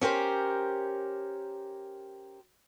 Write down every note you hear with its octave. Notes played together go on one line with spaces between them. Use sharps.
C#4 G4 A#4 C5